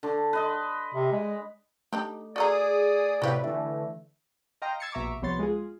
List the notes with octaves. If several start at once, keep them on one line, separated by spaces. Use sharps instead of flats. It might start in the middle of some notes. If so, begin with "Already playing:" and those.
D3 D6
B4 D#5 C6
C3
G#3
A3 D4 D#4 G4
F#4 G#4 A4 D5 A#5 D#6
A2 C3 F#4 G4 B4 F5
D3 E3 A3 E5
D#5 F5 G5 A#5 C6
E6 G#6 A6 C7 C#7
A#1 B2 E5 A#5 C#6 D6
C2 F3 B3 C#5 C6 A6
G#3 F4 G#4